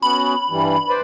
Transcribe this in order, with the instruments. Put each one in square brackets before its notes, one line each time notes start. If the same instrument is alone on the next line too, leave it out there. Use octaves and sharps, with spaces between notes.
[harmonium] B3 C#4 F#4 [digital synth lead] B5
[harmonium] G2 E3 G3
B4 C5 D5